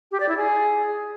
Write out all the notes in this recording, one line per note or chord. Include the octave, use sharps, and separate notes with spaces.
G4
D5
E4
G#4